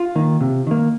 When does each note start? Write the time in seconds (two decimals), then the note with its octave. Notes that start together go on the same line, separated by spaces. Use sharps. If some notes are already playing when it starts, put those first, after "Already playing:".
Already playing: F4
0.16 D#3 A#3
0.41 C3
0.67 D#3 A#3